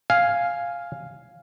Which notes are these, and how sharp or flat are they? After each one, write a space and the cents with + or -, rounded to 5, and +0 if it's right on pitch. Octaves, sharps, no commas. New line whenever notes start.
F5 +0 G#5 +0